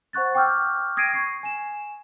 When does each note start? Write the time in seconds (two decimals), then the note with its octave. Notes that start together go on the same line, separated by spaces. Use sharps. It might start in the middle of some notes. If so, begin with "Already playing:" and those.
0.13 C5 F#5 C#6 F#6 A6
0.35 G5 C#6 D6 E6 F6 G6
0.97 D#6 G#6 A#6 C7 D7 D#7
1.13 C#6 C7
1.43 G#5 E7